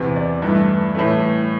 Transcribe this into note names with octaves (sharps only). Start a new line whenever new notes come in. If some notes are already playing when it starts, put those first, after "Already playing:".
Already playing: E2 C3 E3
D5
G2 E3 A3
A2 E3 A3